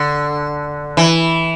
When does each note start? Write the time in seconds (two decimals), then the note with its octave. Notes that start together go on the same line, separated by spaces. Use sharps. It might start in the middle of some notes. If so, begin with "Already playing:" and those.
Already playing: D3
0.97 E3